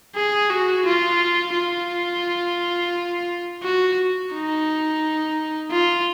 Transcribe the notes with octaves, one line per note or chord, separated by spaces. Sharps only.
G#4
F#4
F4
F4
F#4
D#4
F4